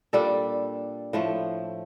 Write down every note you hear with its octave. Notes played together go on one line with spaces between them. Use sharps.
A#2 G3 D4 A4
A2 F3 A3